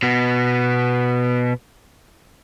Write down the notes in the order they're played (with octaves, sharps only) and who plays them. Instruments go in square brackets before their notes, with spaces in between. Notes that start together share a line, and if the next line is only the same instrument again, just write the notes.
[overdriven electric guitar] B2 B3